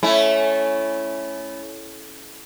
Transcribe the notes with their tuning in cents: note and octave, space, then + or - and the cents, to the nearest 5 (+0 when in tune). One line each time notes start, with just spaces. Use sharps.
A3 -20 C#4 +0 E4 +0